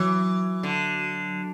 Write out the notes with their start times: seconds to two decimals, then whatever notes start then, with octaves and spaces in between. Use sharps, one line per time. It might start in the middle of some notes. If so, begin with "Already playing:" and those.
Already playing: E3 F#3
0.63 D3